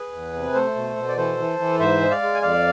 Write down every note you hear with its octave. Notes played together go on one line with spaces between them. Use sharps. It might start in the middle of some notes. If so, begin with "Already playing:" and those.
Already playing: G#4 B4
E2
C3
A3 A4 C5
B2
B2
D5
E3 A4 C5
E3
E3
G#2 C5 E5
G#3
D5 F5
G#3
G#5
F2 D5 F5